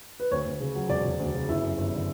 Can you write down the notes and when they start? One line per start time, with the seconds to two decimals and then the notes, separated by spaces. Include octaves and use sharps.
0.20 B4
0.31 D2 C#5
0.46 D2
0.60 C#3
0.75 F#3
0.89 E1 D5
1.05 E1
1.19 D2
1.34 C#3
1.49 G1 E4
1.63 F#2
1.78 G1
1.93 D3